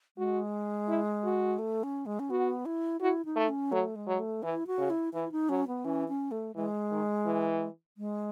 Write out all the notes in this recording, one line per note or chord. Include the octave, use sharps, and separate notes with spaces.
G#3 F#4
E4
F#4
A3
C#4
G#3
C#4
B3 F#4
E4
E4 F#4
D#4
A3
C#4
F#3 A3
G#3
F#3
A3
E3 E4
F#4
C#3
E4
E3 E4
D#4
F#3 C#4
B3
E3 C#4
C#4
A3
E3 G#3
D#3
E3
G#3